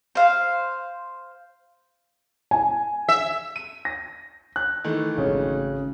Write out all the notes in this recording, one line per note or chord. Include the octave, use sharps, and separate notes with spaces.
C5 F5
G#5
E5
D#7
A#6
F#6
D#3 E3 A3
G#1 C#3